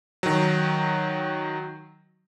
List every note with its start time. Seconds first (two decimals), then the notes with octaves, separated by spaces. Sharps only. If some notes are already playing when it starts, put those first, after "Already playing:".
0.23 D#3 F#3